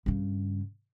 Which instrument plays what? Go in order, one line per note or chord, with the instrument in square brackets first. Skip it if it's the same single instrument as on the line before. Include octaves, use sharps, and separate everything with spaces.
[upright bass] G2 C#3